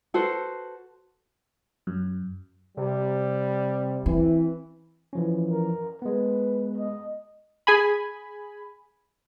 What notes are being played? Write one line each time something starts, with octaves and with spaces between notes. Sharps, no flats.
F#4 A4 B4 C5
F#2
C3 G3
E3 C4
E3 F3 C#4
A#4
G#3 B3 B4
D#5
G#4 G#5 B5